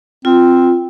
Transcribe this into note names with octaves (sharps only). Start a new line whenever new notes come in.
C4 F4